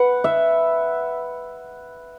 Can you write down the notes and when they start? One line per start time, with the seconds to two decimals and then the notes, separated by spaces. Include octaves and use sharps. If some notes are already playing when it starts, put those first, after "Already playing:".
Already playing: B4 F#5
0.24 E5